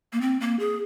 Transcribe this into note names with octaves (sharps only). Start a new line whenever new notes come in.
A#3
C4
A#3
G#4